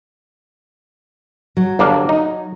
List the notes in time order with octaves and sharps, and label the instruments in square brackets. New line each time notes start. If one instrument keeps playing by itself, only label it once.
[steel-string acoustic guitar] F#3
[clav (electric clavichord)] G1 A#3 D4
D#4